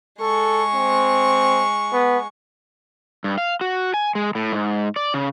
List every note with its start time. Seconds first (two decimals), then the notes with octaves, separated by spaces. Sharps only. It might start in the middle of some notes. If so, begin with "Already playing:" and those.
0.21 G#3 A4 C#6
0.74 C4
1.93 B3
3.24 G2
3.38 F5
3.61 F#4
3.94 G#5
4.15 G#3
4.35 A2
4.53 G#2
4.96 D5
5.14 C#3